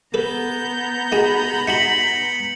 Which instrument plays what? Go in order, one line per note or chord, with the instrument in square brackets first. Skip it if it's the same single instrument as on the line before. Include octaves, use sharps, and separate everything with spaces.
[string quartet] B3 A#5 G6 [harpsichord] A4 B4
[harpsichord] D#4 F#4 G#4 [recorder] B5
[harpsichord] D#4 F#4 C6 [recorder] B6 [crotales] C#7 F#7